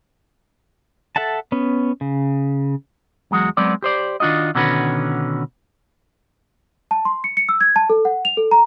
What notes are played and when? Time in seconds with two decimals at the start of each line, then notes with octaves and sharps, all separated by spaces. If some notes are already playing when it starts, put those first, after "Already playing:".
1.16 A4 E5 F#5 A5
1.52 B3 C#4
2.01 C#3
3.31 E2 F#3 G#3 F#4
3.57 F#3 G#3 B3 C4 D5
3.83 G4 C5 D5
4.20 D#3 D4 F4 F#4 D#5
4.55 B2 D3 D#3 C#4 F#4 B4
6.91 A5
7.05 C6
7.24 C#7
7.37 C#7
7.49 E6
7.61 G#6
7.76 A5
7.90 A4
8.05 F#5
8.25 F7
8.37 A4
8.51 A#5